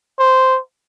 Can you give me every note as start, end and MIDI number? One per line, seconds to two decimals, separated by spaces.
0.19 0.59 72